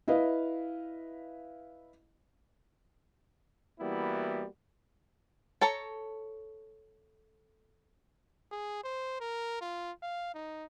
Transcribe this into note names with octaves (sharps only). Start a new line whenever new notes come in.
E4 B4 D#5 F5
E3 G3 A#3 B3 E4 F#4
A4 C#5 A5 A#5
G#4
C5
A#4
F4
F5
D#4